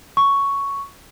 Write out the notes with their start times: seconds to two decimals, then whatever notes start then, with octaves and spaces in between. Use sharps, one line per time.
0.17 C#6